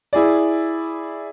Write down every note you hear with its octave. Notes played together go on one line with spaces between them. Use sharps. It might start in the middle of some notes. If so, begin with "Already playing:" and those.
E4 G#4 D5